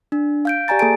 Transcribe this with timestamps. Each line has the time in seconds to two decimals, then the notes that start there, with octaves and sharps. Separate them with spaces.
0.12 D4
0.45 F5 G6 D7
0.68 G4 D5 G#5 A#5 A6
0.79 A#3 G#4 A4 G#5 A5 D7